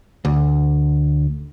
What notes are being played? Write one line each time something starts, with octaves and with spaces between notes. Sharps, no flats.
D2